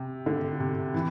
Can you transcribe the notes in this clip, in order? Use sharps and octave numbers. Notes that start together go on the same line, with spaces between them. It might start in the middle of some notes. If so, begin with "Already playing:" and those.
Already playing: C3
D3
C3
E3